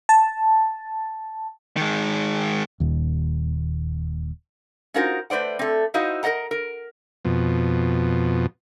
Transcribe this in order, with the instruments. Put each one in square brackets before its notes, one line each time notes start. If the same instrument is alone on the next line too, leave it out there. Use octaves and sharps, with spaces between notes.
[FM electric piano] A5
[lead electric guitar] D#3 G#3
[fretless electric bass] D#1 D#2
[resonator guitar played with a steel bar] C#4 D#4 F4 F#4 A#4 C5
A3 B4 C5 D5 F#5
A3 C4
D#4 E4 F#4 C5 D#5 F5
A#4 C5 D#5 F#5 A#5
A#4
[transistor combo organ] F2 B2